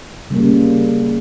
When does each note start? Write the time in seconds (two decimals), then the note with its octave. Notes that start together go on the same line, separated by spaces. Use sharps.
0.30 C#3 G3 A#3